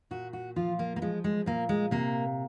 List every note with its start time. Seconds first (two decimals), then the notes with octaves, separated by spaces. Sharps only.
0.11 A#2 F#4
0.33 F#4
0.56 F3 F4
0.79 A#3
0.96 A#3
1.02 F3 G#3
1.24 G#3
1.46 A#2 A#3
1.69 G#3
1.91 C3 A#3